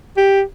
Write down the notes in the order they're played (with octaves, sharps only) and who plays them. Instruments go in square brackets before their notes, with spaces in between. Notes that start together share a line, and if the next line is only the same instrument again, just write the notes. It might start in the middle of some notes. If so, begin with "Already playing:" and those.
[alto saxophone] G4